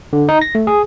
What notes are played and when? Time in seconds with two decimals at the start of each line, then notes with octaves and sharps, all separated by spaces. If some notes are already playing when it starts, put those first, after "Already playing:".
0.13 D3
0.29 D#4
0.42 A#6
0.55 A3
0.67 G#4